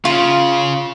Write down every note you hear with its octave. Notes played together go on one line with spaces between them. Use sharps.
C#3 F4